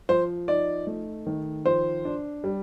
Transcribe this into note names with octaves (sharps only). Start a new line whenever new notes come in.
F3 C5
D#4 D5
A3
D#3
F3 C5
D4
G3